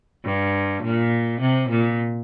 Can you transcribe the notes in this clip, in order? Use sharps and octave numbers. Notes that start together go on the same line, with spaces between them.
G2
A#2
C3
A#2